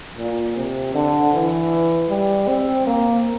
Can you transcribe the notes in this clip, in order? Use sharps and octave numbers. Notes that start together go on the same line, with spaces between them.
A#2
C3
D3
E3
G3
C4
A#3